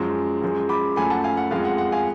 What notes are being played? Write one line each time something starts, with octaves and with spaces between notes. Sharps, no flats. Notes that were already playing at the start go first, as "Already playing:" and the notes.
Already playing: F#2 F3 G#3
F#2 F3 G#3
B5 D6
F#2 F3 A3 G#5 B5
F#5 A5
F5 G#5
F#5
F2 F3 G#3 F5
F#5
F#5
F5 G#5